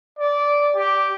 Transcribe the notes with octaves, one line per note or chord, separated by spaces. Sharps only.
D5
G4